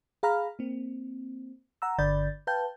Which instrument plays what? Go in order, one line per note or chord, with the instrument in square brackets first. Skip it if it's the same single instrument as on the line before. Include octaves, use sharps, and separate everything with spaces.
[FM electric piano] G#4 F5 A#5 B5 F6
A#3 C4
F#5 A#5 E6
G1 D3 D5 B5 G6 A6
B4 F5 G5 A5 G6